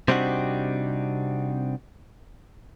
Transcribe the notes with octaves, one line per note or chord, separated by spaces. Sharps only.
C3 G3 C4 D4 D#4 F#4